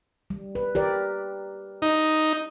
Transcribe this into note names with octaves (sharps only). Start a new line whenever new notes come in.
G3
B4
G4 A#4 D5
D#4